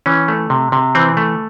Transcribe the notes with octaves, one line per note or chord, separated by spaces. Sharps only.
E3 C#4
A3
C3
C3
E3 C4
A3